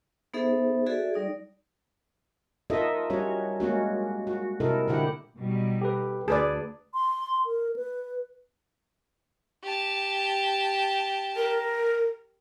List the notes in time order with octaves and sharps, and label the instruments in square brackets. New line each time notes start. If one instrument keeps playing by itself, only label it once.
[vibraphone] B3 D#4 G#4 A4 C5 E5
F#4 G#4 A4 D5 E5
G3 D#4 D5
[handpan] D#4 F4 A4 A#4 D#5 E5
G3 C#4 F#4 C#5
G#3 A#3 C#4 F#4
F#4
C3 E4 A4 A#4 D#5
A#2 D3 E4 G4 F#5
[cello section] B2 G3 D#4
[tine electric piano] G4 A4 B4
[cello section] D2 [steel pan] G#4 B4 D5 [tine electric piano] A5
[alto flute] C6
A#4
B4
[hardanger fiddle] G4 A5
[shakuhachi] A#4